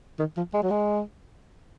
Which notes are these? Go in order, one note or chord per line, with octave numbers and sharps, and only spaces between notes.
D#3
F3
G#3
F#3
G#3